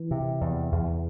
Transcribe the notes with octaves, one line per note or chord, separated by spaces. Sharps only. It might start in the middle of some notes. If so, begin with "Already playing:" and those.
Already playing: E3
C3
E2
E2